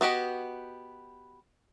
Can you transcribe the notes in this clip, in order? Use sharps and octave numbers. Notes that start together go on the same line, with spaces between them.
B3 F#4 G4 D#5